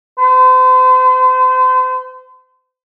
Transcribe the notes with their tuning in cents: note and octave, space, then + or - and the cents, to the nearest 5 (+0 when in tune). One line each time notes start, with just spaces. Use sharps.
C5 -40